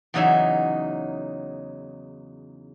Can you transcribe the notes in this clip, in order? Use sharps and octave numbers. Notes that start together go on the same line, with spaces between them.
E2 C#3 F#3 D#4 E5